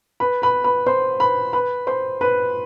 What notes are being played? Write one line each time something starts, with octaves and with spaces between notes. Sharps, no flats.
B4 B5
B4 B5
B4 B5
C5 C6
B4 B5
B4 B5
C5 C6
B4 B5